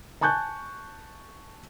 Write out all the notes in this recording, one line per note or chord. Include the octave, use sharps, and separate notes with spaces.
G#5 A5 C#6 F#6 G6